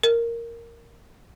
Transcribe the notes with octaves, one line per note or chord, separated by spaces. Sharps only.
A#4